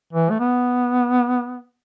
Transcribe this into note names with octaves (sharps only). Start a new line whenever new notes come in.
E3
A3
B3